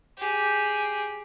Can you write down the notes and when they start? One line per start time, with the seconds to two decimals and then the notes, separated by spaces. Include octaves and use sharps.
0.18 G4 G#4